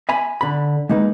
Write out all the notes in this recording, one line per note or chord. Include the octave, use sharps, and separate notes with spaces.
E5 G#5 B5
D3 B5
G#3 A#3 D#4 A#4 B4